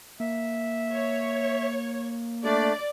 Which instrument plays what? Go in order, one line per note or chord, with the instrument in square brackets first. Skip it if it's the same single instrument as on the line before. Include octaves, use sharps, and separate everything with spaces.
[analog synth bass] A#3 [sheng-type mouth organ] E5
[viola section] C#5
[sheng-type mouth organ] A3 D4 [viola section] D5